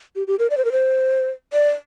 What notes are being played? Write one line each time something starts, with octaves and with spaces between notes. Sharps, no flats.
G4
G4
A#4
D5
C5
A#4
C5
D5